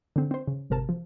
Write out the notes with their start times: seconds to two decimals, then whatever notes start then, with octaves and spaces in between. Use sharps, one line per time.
0.16 D3 C4
0.31 C4 C5
0.47 C#3
0.70 G#1 C3 A#4 A5
0.89 F3